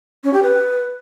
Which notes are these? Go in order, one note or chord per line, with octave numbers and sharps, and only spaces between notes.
C#4
G4
B4